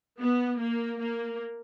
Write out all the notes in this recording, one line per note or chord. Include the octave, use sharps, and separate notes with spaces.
B3
A#3
A#3